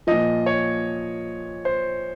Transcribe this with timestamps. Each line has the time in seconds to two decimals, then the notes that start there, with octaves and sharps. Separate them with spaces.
0.07 A#2 F3 D#5
0.46 C#5
1.65 C5